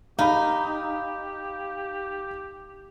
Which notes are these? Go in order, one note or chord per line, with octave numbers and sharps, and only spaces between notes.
D#4 G4 F5 B5